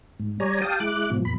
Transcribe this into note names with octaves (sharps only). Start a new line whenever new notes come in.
G#2
G3 C#5 D5 G#5 A#5
G4 F5 G5 A5 D#6
G#3 E4 D6 F#6
G#2 B2 F3
F2 A#2 B5